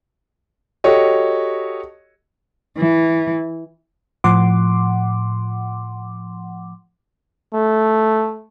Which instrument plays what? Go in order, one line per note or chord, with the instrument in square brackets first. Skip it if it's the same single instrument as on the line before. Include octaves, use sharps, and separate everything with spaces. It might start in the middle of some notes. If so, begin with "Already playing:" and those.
[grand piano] F#4 G4 A4 C#5 D#5
[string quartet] E3
[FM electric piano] A2 F3 F#5 C6 D6
[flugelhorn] A3